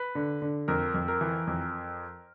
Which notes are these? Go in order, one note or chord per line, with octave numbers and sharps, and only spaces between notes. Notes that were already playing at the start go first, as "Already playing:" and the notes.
Already playing: B4
D3
D3
F2 A#4
F2
A#4
E3
F2